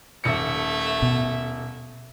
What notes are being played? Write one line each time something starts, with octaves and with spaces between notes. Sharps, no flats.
D#1 A3 E5 C#7
B2